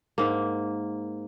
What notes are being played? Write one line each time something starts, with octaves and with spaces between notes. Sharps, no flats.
G#2 A#3